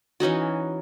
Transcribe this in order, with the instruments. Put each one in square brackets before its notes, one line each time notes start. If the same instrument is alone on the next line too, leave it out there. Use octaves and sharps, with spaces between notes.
[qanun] E3 C#4 D#4 F#4